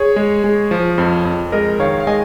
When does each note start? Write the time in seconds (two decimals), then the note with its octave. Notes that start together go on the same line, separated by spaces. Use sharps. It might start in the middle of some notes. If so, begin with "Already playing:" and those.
Already playing: G#4 C#5
0.16 G#3
0.44 G#3
0.71 F3
0.98 F2
1.25 F2
1.52 G#3 A#4 D#5
1.80 D#3 C#5 F5
2.00 F5
2.07 G#3 D#5 G#5